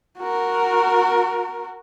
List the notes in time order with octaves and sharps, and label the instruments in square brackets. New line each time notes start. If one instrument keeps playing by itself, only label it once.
[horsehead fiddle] F#4 A#4